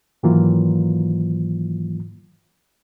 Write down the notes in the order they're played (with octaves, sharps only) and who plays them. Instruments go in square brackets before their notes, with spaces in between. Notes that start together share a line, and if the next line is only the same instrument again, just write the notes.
[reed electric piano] G#2 D#3 E3 F#3 A#3 F4